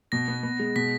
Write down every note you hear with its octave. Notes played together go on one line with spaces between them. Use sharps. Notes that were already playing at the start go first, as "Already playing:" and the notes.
B2 A#6
B3
B3
G#3
B2 B6